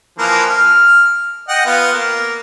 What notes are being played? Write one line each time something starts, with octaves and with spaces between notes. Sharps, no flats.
E3 F3 A#3
F6
D#5 F#5 G5
B3 F4
A#3